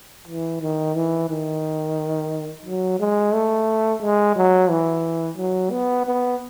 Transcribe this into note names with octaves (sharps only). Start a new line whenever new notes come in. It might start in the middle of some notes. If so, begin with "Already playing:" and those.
E3
D#3
E3
D#3
F#3
G#3
A3
G#3
F#3
E3
F#3
B3
B3